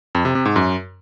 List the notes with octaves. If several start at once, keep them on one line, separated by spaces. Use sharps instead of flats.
F2
C3
C3
G#2
F#2